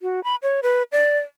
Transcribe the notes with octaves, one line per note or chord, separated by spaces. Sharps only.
F#4
B5
C#5
B4
D5